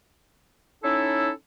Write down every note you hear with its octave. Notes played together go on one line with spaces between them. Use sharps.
C#4 D#4 E4 A4